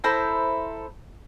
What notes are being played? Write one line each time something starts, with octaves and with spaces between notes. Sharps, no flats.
E4 A4 C5 A#5